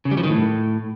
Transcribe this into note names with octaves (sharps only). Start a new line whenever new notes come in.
C#3
G3
F3
D#3
A2